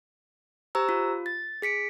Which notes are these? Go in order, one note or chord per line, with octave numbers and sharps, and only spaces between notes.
G4 C5 A#5 E6
F4
A6
G#4 B6 C#7 D7